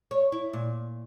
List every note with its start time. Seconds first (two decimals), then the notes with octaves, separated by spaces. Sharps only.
0.11 C#5
0.32 E4
0.53 A#2